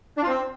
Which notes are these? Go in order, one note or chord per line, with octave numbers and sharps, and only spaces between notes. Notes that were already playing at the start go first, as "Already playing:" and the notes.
D4
F4
C4